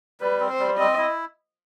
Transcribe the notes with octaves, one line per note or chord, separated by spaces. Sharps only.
G3 B4
C4
C5
G3
C4 D#5
E4